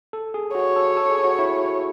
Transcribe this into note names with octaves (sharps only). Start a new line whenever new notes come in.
A4
G#4
F#4 C#5
A4
A4
G#4
F#4
E4